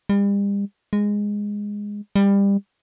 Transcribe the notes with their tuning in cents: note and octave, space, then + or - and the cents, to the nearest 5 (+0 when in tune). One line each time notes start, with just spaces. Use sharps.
G3 +40
G#3 -10
G3 +25